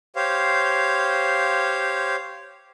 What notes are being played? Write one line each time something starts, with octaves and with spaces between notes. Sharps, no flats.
G4 C5 C#5 F5